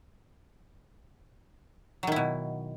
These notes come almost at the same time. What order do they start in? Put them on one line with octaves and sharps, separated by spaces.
F#3 D#3 E4 B2